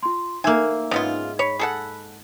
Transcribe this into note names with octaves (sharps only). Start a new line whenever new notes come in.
F4 C6
A#3 D#4 C5 E5 G#5 E6
G#2 C#3 B3 F4
C#5 B5 B6
G#4 A4 F#5